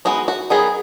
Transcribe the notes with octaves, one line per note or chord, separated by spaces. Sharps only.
G#3 B3 D#4 F#4
F#4
D#3 F#3 B3 D#4 G#4